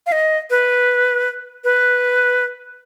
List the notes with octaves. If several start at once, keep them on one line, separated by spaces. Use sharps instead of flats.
F5
D#5
B4
B4